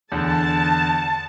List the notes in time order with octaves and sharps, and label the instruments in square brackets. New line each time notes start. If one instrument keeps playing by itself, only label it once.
[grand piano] E2 D3 [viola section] A5